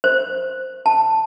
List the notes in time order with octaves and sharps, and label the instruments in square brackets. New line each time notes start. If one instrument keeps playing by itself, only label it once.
[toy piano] C5
A5